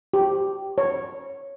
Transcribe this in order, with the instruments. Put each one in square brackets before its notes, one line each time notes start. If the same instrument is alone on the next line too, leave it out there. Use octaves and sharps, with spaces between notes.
[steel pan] G4
C#5